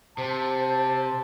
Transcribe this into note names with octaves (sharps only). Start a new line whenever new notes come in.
C3 C5 A5